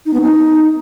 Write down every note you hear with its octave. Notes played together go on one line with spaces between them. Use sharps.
D#4
B3
D#4